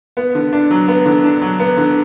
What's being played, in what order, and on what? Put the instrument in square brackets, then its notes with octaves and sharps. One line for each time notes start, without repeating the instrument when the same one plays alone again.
[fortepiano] B3
D3
D4
F#3
B3
D3
D4
F#3
B3
D3